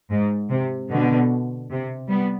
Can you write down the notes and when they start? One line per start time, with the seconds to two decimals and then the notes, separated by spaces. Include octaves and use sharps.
0.11 G#2
0.50 C3
0.90 B2 D3
1.70 C3
2.09 G3 B3